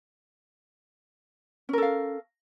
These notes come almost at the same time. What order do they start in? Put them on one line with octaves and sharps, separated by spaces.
C#4 A#4 A4 F5